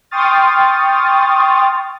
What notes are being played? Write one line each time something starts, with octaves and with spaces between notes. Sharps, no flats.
G5 C6 C#6 D#6 F6 A6